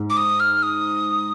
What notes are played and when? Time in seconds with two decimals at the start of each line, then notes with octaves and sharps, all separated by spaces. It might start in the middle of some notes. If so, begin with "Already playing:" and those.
Already playing: G#2
0.10 D6
0.17 D#6
0.40 F6
0.63 D#6